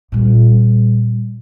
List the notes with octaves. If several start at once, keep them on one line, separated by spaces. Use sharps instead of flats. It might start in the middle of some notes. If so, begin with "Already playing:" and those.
A#2 G3